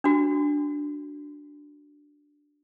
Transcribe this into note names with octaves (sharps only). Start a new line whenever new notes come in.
D4 F#4